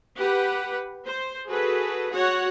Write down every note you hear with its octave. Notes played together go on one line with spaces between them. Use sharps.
G4 B4 F#5
C5
F#4 G#4 A4 B4
F#4 C#5 F#5